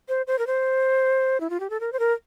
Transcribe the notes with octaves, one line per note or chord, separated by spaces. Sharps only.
C5
C5
A#4
C5
E4
F4
G4
A4
A#4
C5
A#4